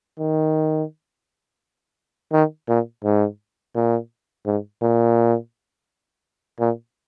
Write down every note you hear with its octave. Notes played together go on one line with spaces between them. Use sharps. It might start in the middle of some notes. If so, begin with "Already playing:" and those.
D#3
D#3
A#2
G#2
A#2
G#2
A#2
A#2